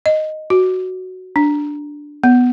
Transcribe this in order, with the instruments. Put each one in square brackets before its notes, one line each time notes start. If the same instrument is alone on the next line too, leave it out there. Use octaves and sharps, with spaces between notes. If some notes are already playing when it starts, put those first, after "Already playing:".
[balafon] D#5
F#4
D4
B3